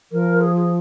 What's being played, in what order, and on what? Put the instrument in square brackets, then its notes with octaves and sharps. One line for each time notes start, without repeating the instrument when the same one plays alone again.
[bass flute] F3 [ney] A#4
[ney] G#4
G#4